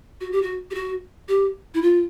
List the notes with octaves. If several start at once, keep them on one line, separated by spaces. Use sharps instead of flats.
F#4
G4
F#4
G4
F#4
G4
E4
F4